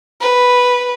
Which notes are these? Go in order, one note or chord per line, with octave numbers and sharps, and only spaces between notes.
B4